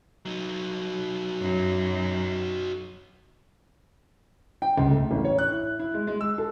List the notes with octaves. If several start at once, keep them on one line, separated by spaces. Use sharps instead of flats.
F#3 D#4
F#2
G5
C#2
A3
A1
C#5
F#6
E4
E4
G#3
G#3
E6
A4